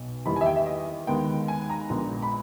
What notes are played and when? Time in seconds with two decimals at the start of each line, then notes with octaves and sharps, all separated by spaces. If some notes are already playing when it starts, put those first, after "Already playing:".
Already playing: B1 B2
0.25 E2 D#3 G3 A#3 B5
0.36 G#5
0.41 E5
0.46 G5
0.56 E5
0.66 D#5
1.07 D#2 D#3 G#3 B3 G5
1.48 G#5
1.70 A#5
1.89 A#1 A#2 G#3 B3
2.22 B5